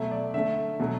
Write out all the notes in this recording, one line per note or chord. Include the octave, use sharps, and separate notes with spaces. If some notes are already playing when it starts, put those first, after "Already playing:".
Already playing: B2 F#3 A3 E5
D5
D3 A3 E5
B2 F#3 A3